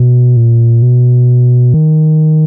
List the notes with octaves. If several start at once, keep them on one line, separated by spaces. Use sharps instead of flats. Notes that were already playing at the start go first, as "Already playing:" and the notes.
Already playing: B2
A#2
B2
D#3